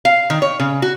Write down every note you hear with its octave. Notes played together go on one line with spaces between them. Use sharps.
F5
D#3
C#5
C#3
F#4